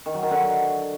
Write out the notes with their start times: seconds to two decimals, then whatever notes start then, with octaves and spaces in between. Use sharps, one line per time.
0.06 D#3
0.14 F#3
0.23 D#3
0.31 D3
0.39 F#3